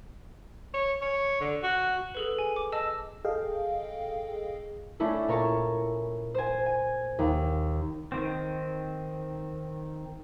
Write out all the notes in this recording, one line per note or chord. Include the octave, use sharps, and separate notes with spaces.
C#5
C#5
D3
F#4
G#4 A4 B4
G#5
D6
D#5 A5 E6
G#4 A4 D#5 F5 G5
A3 C#4 D4 E4 A4
A#2 A#4 C#5 A5 C#6
C5 G#5
G#5
D#2
D#3 C4